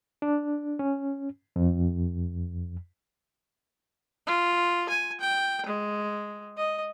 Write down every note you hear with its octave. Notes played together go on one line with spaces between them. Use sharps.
D4
C#4
F2
F4
G#5
G5
G#3
D#5